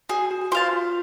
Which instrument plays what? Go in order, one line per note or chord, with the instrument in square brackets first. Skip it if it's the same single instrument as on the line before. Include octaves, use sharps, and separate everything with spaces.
[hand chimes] F#4 [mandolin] G#4
[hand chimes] F#4
F#4
[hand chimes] F4 [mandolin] C5 F5 A5
[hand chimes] F4